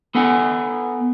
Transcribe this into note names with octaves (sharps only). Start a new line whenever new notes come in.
B3 A4 F#5 G#5